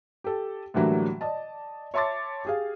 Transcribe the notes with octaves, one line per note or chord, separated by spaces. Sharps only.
G4 A4
A2 D3 E3 F#3 G3 A#3
D5 D#5 A5
C#5 E5 A5 C6 D6 A6
G4 G#4 F5